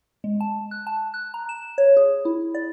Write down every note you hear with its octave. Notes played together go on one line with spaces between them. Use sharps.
G#3
A5
F#6
A5
F#6
A#5
E7
C#5
G#4
E4
D5